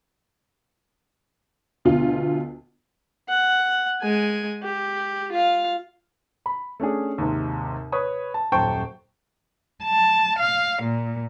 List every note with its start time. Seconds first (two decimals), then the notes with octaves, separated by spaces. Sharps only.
1.85 D2 B2 F4
3.28 F#5
4.02 G#3 G#5
4.63 G4
5.32 F4 F5
6.46 B5
6.80 A3 C#4 D4 G#4
7.18 D#2 G#2 C3
7.92 B4 C#5 D#6
8.34 A5
8.52 D#1 F#2 C5 G5 A5 C#6
9.83 A5
10.37 F5
10.82 A#2